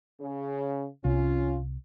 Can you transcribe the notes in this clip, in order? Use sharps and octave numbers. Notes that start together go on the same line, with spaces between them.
C#3
C2 C#4 F4